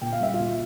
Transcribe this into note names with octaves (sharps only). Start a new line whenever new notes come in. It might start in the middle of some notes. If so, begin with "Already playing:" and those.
A#2 G5
F5
G3 A#3 E5
A#2 F4 F5